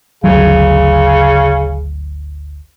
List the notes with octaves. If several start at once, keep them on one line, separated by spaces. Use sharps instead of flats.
G1 D2 C#3 F#3